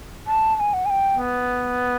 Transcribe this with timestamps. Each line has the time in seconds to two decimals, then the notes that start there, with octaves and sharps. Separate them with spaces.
0.27 A5
0.56 A5
0.60 G#5
0.74 F#5
0.86 G#5
0.90 G5
1.14 B3